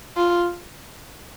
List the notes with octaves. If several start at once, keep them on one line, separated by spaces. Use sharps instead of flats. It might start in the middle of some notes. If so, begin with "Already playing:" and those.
F4